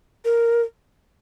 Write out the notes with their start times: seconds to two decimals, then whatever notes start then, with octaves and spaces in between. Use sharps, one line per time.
0.25 A#4